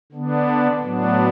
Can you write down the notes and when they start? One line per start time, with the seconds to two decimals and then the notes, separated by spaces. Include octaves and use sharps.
0.12 D3 B3 D4
0.81 A2 F#3 B3 D4